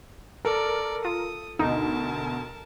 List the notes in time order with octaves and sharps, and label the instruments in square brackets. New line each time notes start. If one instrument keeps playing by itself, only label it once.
[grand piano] A4 [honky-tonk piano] A#4 [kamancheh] D5
[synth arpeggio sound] F4 [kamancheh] D#6
[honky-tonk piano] D2 B2 [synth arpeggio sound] D#4 [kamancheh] A#4 A5